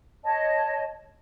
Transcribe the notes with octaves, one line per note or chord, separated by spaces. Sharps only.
C#5 D#5 A5